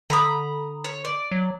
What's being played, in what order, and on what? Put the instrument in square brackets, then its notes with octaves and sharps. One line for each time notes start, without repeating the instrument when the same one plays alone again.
[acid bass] D3 [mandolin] A#5 B5 D#6
[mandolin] C#5
D5
[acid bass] F#3